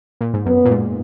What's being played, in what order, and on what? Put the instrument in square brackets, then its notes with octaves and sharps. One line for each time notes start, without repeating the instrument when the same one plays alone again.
[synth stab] A#2
G#2
[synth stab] F#2 [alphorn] B3
[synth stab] A#2
G#2